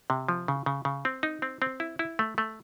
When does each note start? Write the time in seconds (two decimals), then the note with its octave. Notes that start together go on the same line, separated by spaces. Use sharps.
0.10 C3
0.29 F3
0.48 C#3
0.66 C#3
0.85 C#3
1.05 C4
1.23 D#4
1.42 C4
1.62 C4
1.80 E4
1.99 E4
2.19 A3
2.38 A3